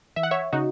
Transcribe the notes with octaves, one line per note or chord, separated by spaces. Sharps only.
E3 E5
F#5
C#5 E5
C#3 D#4 F#4